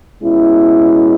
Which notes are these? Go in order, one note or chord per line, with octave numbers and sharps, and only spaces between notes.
B2 G#3 C#4 E4